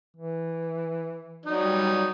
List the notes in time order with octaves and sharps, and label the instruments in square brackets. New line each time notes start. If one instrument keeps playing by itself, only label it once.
[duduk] E3
[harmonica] F#3 D#4 D5
[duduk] G3